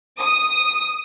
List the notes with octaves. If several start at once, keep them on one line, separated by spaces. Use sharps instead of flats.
D#6